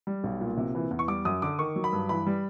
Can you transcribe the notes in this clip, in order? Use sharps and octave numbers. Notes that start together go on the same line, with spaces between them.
G3
B1
A#2
C3
E3
E2
C#6
G3 D6
F#2 D#6
D3 D6
D#3 C#6
F#3
B5
G2
E3 B5
G3